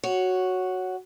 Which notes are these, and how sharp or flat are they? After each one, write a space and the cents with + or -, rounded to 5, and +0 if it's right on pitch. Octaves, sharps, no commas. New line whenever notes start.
F#4 +0 C#5 +0